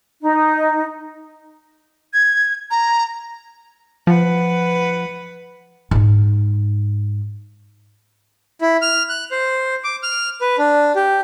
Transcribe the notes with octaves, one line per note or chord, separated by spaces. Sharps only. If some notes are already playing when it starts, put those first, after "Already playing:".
D#4
G#6
A#5
F3 B4 F#5
G#2 D#4
E4
F6
F#6
C5
D6
F6
B4
D4
G4